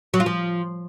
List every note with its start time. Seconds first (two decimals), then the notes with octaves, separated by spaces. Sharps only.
0.14 F#3
0.20 F4
0.26 F3